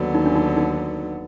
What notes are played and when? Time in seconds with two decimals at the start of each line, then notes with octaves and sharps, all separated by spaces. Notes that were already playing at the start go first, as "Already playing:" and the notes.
Already playing: D#2 D3 F#3 B3
0.14 D#4
0.26 D4
0.36 D#4
0.57 D#4